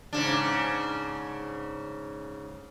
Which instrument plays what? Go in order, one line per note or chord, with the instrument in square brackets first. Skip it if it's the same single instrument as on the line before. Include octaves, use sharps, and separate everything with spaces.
[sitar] G#2 C#3 D4